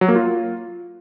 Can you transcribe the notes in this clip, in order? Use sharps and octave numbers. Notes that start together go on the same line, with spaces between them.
F#3
A#3
F4